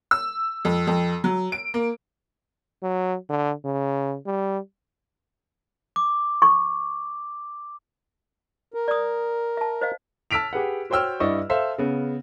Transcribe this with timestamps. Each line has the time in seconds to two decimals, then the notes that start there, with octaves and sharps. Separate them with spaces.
0.11 E6
0.65 F2
0.87 F2
1.24 F#3
1.52 D7
1.74 A#3
2.83 F#3
3.29 D3
3.65 C#3
4.26 G3
5.96 D6
6.42 C#6
8.74 A#4
8.88 D5 D#6
9.57 E5 A5
9.81 C5 D#5 F5
10.31 A5 E6 F6 B6 D7 F7
10.53 G4 G#4 B4 F#5
10.90 F#4 C5 C#5 G5 E6 F6
11.20 G2 E4 D5 D#5 C#6
11.49 A4 C5 E5 F5
11.78 C#3 B3